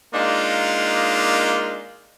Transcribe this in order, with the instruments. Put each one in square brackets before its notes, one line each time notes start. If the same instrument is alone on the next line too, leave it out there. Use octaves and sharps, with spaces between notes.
[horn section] G#3 A#3 D4 D#4 F4